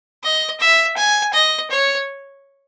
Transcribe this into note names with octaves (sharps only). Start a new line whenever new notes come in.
D#5
E5
G#5
D#5
C#5